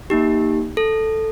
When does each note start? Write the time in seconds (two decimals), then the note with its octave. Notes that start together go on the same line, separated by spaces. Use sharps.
0.10 A#3 D#4 G4
0.77 A4